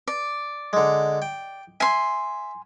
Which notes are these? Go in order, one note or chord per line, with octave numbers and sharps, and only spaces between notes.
D5
D3 G#3
G5
E5 G#5 C6